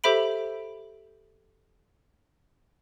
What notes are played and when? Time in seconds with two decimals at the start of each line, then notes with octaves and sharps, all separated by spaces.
0.04 G4 A4 C5 E5 B5 D7